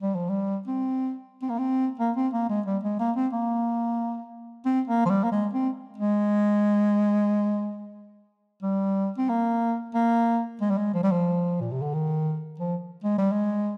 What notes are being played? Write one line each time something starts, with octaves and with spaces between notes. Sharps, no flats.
G3
F3
G3
C4
C4
A#3
C4
A#3
C4
A#3
G#3
G3
G#3
A#3
C4
A#3
C4
A#3
F3
G3
A#3
G#3
C4
G#3
G3
C4
A#3
A#3
G#3
G3
G#3
F3
G3
F3
A#2
C3
D3
D#3
F3
G#3
G3
G#3